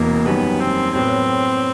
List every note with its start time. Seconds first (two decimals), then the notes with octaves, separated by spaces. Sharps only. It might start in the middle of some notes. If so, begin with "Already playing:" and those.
Already playing: E1 E2 C3 E3 A#3
0.26 F#2 D#3 G3 B3
0.60 C4
0.94 A2 F#3 B3 C4